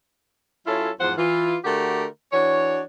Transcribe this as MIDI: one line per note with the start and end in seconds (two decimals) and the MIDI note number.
0.67 0.90 54
0.67 0.90 61
0.67 0.90 64
0.67 0.90 65
0.67 0.90 69
0.67 0.90 73
1.00 1.13 40
1.00 1.13 44
1.00 1.13 53
1.00 1.13 72
1.00 1.13 78
1.17 1.56 52
1.17 1.56 65
1.65 2.06 50
1.65 2.06 57
1.65 2.06 66
1.65 2.06 67
1.65 2.06 70
2.33 2.81 52
2.33 2.81 62
2.33 2.81 66
2.33 2.81 73